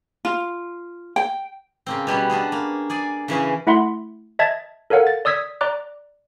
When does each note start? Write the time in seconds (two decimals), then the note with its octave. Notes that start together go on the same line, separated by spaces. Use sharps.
0.25 F4
1.16 G5
1.86 C#3 A#3 C4
2.07 B2 G3 B3 C#4
2.30 B3 C#4 D4 G#4
2.52 A#3
2.90 G#4 D5 G#5
3.28 C#3 E3 C#4 G#4
3.67 A3 E4 E5 F#5 B5 C6
4.39 D#5 E5 A5 G#6 A6
4.90 A4 A#4 C#5 F5 F#5
5.07 A6
5.25 D5 D#6 E6 G#6 B6
5.61 D5 A#5 D6 F#6